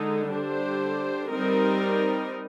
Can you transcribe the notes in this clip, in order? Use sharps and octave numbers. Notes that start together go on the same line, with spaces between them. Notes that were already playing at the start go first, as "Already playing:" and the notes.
Already playing: D3 G#3 D#4
D3 G3 D4 G4 C5
G3 C4 D#4 A#4